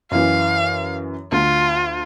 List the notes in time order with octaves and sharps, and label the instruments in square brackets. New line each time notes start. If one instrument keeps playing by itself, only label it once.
[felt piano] F#2 E3 [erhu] F5
[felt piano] D2 [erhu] F4